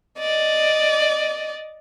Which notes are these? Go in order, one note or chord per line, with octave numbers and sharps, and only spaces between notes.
D5 D#5